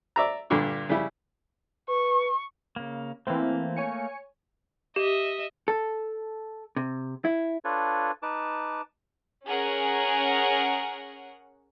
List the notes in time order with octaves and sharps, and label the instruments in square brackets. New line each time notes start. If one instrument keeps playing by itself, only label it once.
[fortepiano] D5 E5 A#5
G2 A#2 D3
C#3 G3 E4
[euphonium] B4 [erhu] C#6
[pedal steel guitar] C#3 A#3
[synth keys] E3 C4 [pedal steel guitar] A3 A#3
[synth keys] C#5 G#5 C#7
[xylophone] G4 [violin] D#5 E5
[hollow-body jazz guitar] A4
C3
E4
[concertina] D4 F4 A4 B4 C#5
D#4 B4 A5 D6
[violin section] C#4 G#4 A#4 F#5